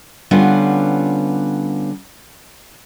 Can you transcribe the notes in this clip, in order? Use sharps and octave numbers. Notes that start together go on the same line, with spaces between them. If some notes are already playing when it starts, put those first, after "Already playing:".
D3 G3 B3 C#4 F4